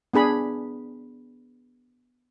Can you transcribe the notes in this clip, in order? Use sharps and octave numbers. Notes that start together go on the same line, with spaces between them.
B3 D4 G#4 B5